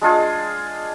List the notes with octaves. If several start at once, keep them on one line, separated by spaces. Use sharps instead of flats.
G#3 D4 F4 G#4